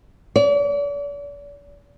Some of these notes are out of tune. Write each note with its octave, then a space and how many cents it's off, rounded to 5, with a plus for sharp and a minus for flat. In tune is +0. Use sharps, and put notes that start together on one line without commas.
D5 -40